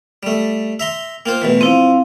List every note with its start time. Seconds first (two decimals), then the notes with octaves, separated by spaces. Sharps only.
0.23 G3 A3
0.80 E5 A#5 C6
1.26 A#3 F4 C5 G5
1.42 A1 B2 E3
1.61 F3 C4 E4 F5